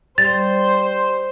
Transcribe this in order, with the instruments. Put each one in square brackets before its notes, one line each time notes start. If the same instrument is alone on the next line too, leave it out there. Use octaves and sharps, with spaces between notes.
[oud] G3 [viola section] C5 [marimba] A6